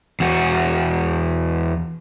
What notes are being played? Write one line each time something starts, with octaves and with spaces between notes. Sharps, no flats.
E2 F#4